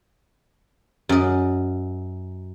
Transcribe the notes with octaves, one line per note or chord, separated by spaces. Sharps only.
F#2 D#5